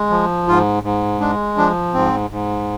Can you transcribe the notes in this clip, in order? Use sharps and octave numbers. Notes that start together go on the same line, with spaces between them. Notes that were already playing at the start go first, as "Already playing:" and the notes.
Already playing: G#3
F3
G#2 F4
G#2
G#3 D4
F3 D4
G#2 C4
G#2